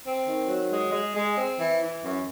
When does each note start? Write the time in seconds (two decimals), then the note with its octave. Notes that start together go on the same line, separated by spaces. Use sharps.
0.04 C4
0.26 D#3
0.48 F#3
0.70 G#3
0.92 G#3
1.14 G#3
1.36 C4
1.58 E3
1.80 E3
2.02 F#2